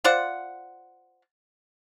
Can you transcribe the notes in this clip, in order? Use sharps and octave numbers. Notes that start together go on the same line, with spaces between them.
F4 C5 D5 F#5